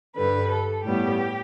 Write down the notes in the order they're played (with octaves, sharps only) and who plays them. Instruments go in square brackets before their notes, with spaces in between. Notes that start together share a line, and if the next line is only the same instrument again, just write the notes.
[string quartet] G2 D3 G3 B4
A4
A2 G3 B3 G4